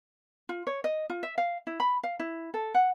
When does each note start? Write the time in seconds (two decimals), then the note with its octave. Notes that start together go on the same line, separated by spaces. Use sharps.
0.49 F4
0.67 C#5
0.84 D#5
1.10 F4
1.23 E5
1.38 F5
1.67 E4
1.80 B5
2.03 F5
2.20 E4
2.54 A4
2.74 F#5